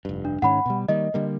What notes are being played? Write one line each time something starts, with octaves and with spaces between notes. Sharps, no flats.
F1 G2
D4
G#2 D#3 C#4 F#5 B5
B2 G3
D#3 G3 A#3 D#5
D3 G3 A#3